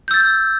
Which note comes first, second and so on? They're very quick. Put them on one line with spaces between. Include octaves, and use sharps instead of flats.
G6 E6 A6